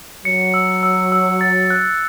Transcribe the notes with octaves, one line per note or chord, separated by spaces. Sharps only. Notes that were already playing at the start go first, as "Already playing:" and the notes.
F#3 C#7
E6
E6
E6
A6
F#6